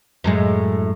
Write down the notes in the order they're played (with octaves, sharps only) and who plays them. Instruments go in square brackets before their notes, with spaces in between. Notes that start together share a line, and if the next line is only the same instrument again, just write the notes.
[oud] F#2 A2 G#3